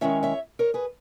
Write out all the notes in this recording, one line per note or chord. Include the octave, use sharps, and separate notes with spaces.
D#3 G#3 C#4 E4 C#5 E5
C#5 E5
A#4 C#5
G#4 B4